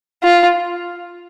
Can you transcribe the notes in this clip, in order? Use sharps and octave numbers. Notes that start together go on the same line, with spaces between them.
F4